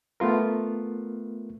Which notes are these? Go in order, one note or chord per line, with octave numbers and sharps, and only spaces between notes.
A3 B3 F4 A#4